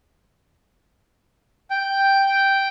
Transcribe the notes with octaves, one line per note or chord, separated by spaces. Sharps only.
G5